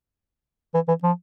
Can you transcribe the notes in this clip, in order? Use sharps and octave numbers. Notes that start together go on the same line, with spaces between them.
E3
E3
F3